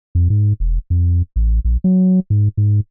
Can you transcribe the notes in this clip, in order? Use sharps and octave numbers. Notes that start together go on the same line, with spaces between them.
F2
G#2
E1
F2
A1
A#1
F#3
G#2
G#2